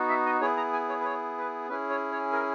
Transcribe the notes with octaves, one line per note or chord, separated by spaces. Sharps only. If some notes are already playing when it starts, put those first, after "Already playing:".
Already playing: B3 D#4 F#4
E5
D#5
B3 E4 G#4 C#5
A#5
G#5
C#5
B4
C#5
B4
C#4 E4 G#4 B4
C#5
C#5
A#4